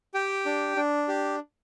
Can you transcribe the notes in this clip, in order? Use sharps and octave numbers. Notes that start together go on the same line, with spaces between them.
G4 G5
D4
D4
G4